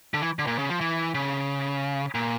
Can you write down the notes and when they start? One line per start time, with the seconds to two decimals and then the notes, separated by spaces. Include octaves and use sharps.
0.14 D3
0.22 E3
0.39 D3
0.47 A#2
0.59 C#3
0.70 F3
0.81 E3
1.15 C#3
2.15 A#2